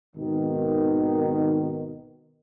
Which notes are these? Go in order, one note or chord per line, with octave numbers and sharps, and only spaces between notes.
G#1 B2 D#3